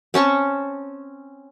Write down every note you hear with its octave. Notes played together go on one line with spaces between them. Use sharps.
C4 C#4 A5 C#6